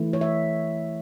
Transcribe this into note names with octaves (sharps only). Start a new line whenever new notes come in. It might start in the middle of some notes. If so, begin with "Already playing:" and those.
Already playing: E3 A3 E4
C#5
E5